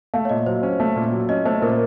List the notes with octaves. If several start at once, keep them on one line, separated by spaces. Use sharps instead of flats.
A3 F5
C#5
A#2 D#5
F#3 C5
C#4
A3
A#2
F#3
C#4 D#5
A3 C5
A#2 A#4